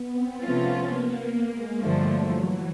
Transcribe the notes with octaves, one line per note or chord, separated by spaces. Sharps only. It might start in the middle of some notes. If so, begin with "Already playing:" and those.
Already playing: B3
C4
C3 F3 A3 B3 C#4 F4
A#3
G#3
G2 D3 F3 F#3 A3
E3